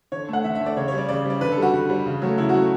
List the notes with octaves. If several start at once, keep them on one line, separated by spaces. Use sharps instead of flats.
D3 C#5
A3 F#5
D3 E5
E5
A3
D5
C#3 C#5
C#5
G3
D5
C#3 D5
G3 D5
D3 B4
A4
G3 F#4
D3
G3
C#3
F#3 A3
C#3 E4
F#4
F#3 A3